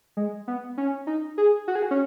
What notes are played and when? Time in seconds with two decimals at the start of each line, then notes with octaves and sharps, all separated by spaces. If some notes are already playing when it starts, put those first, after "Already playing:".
0.17 G#3
0.48 B3
0.78 C#4
1.07 D#4
1.38 G#4
1.68 F#4
1.75 G#4
1.83 F#4
1.91 C#4